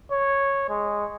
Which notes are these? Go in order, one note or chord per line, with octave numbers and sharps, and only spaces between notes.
C#5
G#3